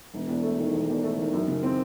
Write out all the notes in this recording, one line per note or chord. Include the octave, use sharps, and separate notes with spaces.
E1
E2
A3
D#3
E1
E2
A3
D#3
F#2
C#3
C4